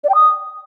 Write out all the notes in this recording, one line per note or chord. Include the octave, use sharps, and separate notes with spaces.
D5
G5
D#6